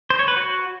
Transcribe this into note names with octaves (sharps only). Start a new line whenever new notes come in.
C5
C#5
B4
F#4